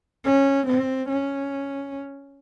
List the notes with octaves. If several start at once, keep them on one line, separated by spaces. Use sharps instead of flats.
C#4
C4
C#4